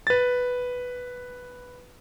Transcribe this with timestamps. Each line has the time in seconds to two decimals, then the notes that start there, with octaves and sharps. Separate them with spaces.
0.07 B4 A6